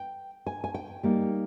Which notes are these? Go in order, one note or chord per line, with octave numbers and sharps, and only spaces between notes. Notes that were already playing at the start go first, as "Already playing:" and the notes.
Already playing: G5
G#5
G#5
G5
G3 A#3 D#4